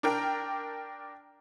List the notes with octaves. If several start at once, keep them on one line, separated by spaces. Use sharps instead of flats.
D4 A#4 G5